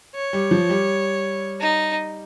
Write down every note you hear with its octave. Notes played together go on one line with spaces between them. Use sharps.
C#5
G3
F3
G3
D#4